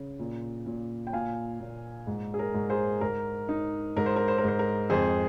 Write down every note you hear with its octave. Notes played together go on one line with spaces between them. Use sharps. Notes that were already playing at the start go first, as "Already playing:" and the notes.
Already playing: C#3
A#2
A#2
G5
A#2 F5 G#5
A#2
G#2
G#4
A#4
G#2
G#4 C5
G#2 A#4
D#4
G#2 A#4
C5
A#4
C5
A#4
G#2 C5
A#4
F2 G#4 C5